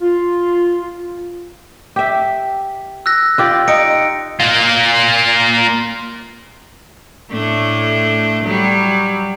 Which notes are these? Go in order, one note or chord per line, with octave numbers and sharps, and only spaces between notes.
F4
G4 E5
E6 F#6 A#6
F4 G4 D5
D#4 A#6 C#7 D7
A#3 F4
A2 A3 D4
F#3 G3